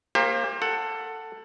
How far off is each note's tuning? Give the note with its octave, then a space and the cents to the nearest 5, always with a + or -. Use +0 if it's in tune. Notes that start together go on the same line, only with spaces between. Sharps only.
A#3 +0 G4 +35 C5 +30
A4 +15 F#5 +0